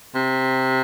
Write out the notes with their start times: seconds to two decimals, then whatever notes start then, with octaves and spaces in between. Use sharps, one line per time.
0.15 C3